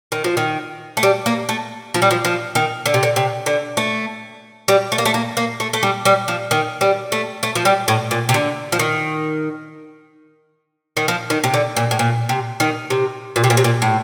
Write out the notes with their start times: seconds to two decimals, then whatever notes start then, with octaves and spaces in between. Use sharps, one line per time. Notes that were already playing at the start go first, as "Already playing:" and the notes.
0.12 D#3
0.24 F3
0.37 D#3
0.97 A3
1.03 G3
1.26 A#3
1.49 A3
1.94 F3
2.02 G3
2.11 F3
2.25 F3
2.55 D#3
2.86 D3
2.94 C3
3.03 D3
3.16 C3
3.46 D3
3.77 A3
4.68 G3
4.92 A3
4.98 A#3
5.05 A3
5.14 A#3
5.37 A#3
5.60 A3
5.73 A3
5.83 G3
6.05 G3
6.28 F3
6.51 D#3
6.81 G3
7.12 A3
7.43 A3
7.55 F3
7.65 G3
7.88 A2
8.11 A#2
8.29 C3
8.34 D3
8.72 F3
8.79 D#3
10.97 D#3
11.08 F3
11.30 D#3
11.44 C3
11.54 D3
11.77 A#2
11.91 A2
11.99 A#2
12.29 C3
12.60 D#3
12.90 C3
13.36 A#2
13.44 C3
13.50 A#2
13.57 C3
13.64 A#2
13.82 A2